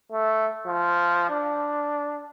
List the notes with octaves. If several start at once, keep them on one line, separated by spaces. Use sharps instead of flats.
A3
F3
D4